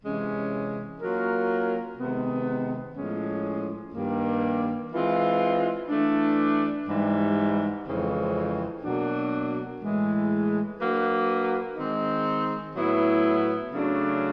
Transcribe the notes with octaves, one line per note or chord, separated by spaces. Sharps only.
C3 E3 G#3 C#4
F#3 A#3 C#4 F4 A#4
C3 D#3 G#3 B3
A2 F3 G#3 C#4
G2 D#3 G3 A#3
E3 G#3 C4 F4
E3 A3 D4
G#2 E3 G3
F2 C#3 E3 G#3 C4
B2 F#3 A#3 D4 F#4
A2 E3 G#3
F#3 A#3 D4 F#4 B4
D#3 G#3 C4 D#4
A2 F#3 B3 E4
C#3 F#3 A3 D4